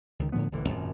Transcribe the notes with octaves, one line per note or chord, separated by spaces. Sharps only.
C#2 D#3
A2 D3 F3 B3
D#1 A1 D3 E3
G#1 F#2 A#2